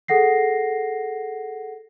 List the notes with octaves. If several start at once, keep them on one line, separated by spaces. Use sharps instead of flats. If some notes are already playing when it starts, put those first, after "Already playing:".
G#4 A4 F#5 A#6 C7